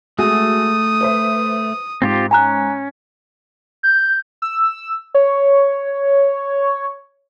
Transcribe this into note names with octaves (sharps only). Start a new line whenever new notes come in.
G#3 A3 F#4 G#4 D#6
B4 C5 E5
G#2 C4 F4 G4
C#4 G#5 A#5 F#6
G6
E6
C#5